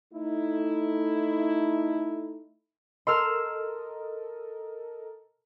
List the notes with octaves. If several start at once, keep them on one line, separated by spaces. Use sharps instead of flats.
A3 D#4 E4
A4 A#4 D#5 C6 E6 F6